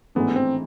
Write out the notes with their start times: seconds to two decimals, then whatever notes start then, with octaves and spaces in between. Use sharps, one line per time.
0.15 A1 G#2 E3 A3 B3 D4
0.36 C4